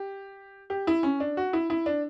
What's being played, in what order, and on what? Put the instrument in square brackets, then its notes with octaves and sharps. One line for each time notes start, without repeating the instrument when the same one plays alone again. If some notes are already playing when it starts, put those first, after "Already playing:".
Already playing: [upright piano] G4
G4
E4
C#4
D4
F#4
E4
E4
D4